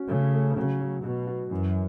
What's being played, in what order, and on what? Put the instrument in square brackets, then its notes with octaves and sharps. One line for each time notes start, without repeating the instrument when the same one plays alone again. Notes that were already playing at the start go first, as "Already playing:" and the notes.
Already playing: [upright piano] C#4 F#4
[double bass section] C#3 [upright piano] A3
[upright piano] A3
[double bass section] C#3 [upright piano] F#3
[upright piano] F#3
[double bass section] B2 [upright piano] F#4
[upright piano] F#4
[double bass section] F#2 [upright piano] E3